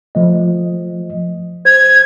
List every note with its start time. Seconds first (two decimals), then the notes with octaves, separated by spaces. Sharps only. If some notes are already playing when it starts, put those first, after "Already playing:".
0.15 F3 A3 D#5
1.65 C5 G#6